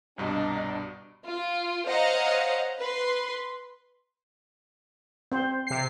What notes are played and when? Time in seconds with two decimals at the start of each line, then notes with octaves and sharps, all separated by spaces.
0.18 C2 G2 B2 D4 D#5 A#5
1.25 F4
1.87 C5 C#5 D#5 F5 F#5 A#5
2.79 B4 C6
5.32 C4 C5
5.67 C3 C7